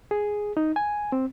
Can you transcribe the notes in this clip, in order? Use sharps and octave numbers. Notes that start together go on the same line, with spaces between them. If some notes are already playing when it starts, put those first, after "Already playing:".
G#4
D#4
G#5
C4